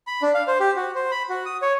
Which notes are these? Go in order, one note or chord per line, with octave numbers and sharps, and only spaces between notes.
B5
D4
F5
C5
G4
F#4
C5
B5
F#4
D#6
C#5